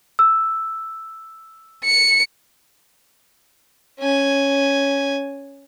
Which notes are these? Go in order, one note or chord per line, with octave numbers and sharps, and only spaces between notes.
E6
C#7
C#4 G#5